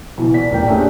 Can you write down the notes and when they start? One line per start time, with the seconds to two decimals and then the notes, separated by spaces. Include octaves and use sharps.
0.18 B2 E3
0.34 D5 B6
0.51 D#1 A1 A#4 D5 G5
0.68 A3 C#4 D4 G4 G#4